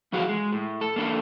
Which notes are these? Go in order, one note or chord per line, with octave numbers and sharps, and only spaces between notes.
F#2 E3 F#4 G#4 F5
G#3
A2
A4
A#3 D4 A4